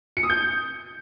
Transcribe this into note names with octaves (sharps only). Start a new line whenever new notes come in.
C#7
D#6
G6